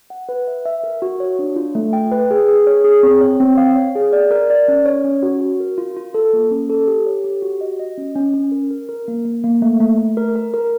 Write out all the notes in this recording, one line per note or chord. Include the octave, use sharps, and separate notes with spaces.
F#5
B4
E5
E5
A#4
F#4
C#5
D4
F4
A3
G5
B4
G#4
G#4
C#5
G#4
C4
C#5
C4
F5
C#5
G#4
D5
A#4
D5
C#4
C#5
C#4
F#4
F#4
A#4
F4
F4
A4
A#3
C#4
A4
G4
C#5
G4
F#4
D#5
D#5
C#4
C#4
C#4
A#4
A#4
A#4
A#3
A#3
A#3
A3
A3
A3
A#4
A#4
A#4